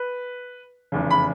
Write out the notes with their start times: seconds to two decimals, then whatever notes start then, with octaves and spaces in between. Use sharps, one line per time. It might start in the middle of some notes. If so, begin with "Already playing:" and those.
Already playing: B4
0.92 F1 E2 C#3
1.11 B5